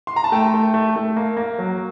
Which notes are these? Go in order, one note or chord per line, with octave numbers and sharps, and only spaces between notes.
C6
A#5
A5
A3 G5
A3
A3
A3
A#3
A#3
F#3